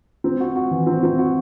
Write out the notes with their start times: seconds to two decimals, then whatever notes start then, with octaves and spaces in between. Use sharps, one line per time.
0.24 C4
0.40 F#4
0.56 F#4
0.71 E3
0.87 C4
1.03 C4
1.18 F#4